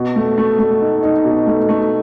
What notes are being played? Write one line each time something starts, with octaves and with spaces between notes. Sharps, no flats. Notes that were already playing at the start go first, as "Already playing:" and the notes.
Already playing: B2
A3
A3
A3
D#4
D#4
B2
A3
A3